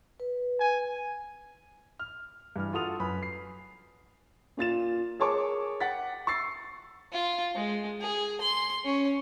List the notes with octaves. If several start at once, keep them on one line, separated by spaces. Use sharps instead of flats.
B4
G#5
F6
G2 E3 F6
F4 F#4 A4 D#6 F7
F#2 B4 B5
C7
A#2 F4 A6 E7
G#4 A#4 C#5 A5 C#6 D6
F#5 G5 A6 B6
C#6 E6 A6 C7
F4
G#3
G#4
C6
C#4